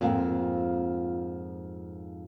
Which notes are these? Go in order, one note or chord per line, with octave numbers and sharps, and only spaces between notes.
F2 G#2 F3 A#3 C4